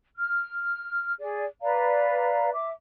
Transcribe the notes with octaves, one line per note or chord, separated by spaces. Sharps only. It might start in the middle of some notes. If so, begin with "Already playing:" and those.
F6
G#4 D5
B4 D5 F5 A#5
E5 D6